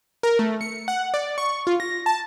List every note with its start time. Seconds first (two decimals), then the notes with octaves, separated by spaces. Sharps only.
0.23 A#4
0.39 A3
0.61 C#7
0.88 F#5
1.14 D5
1.38 C#6
1.67 F4
1.80 A#6
2.06 A5